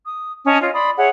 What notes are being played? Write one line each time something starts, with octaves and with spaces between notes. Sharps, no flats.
D#6
C#4 D#5 A5 D#6
F4 C#5 D#5 F6
D5 B5 C6 D#6
G#4 C#5 E5 F#5